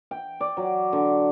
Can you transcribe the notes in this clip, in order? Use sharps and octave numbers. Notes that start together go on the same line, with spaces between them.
G5
D5
F#3
D3